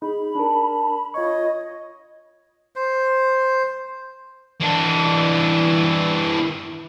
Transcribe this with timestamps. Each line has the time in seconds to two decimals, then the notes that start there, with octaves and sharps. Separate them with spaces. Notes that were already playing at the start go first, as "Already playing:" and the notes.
0.02 D#4 G#4 B5
0.35 D4 A#4 A5
1.14 F4 C#5 D#5 C#6 G#6
2.76 C5
4.60 E3 D4